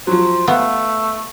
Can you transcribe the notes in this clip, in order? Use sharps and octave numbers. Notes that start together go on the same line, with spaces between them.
F3 F#3 C5
A3 B3 F5